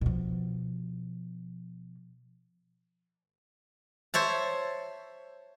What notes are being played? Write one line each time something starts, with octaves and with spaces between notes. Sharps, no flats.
B2 F3
C5 C#5 E5 A5